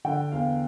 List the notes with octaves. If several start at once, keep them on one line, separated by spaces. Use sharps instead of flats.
D3 G5
E2 F5